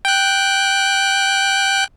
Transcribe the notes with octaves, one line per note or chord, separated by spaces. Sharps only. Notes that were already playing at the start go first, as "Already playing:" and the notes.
G5 F#6